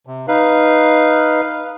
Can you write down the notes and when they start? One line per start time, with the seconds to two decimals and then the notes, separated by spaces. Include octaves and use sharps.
0.07 C3
0.28 D#4 B4 F5